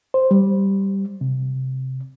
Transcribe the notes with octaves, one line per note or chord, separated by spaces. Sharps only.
C5
G3
C3